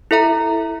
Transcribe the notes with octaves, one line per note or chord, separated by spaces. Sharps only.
E4 A4 E5 A#5